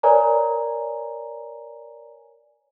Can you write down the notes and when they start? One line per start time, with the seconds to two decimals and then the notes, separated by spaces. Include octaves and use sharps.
0.03 A#4 B4 C#5 D5 G#5 A#5